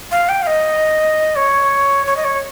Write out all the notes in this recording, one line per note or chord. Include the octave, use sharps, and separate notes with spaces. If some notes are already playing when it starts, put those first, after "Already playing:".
F5
G5
F5
D#5
C#5
C#5
D#5
C#5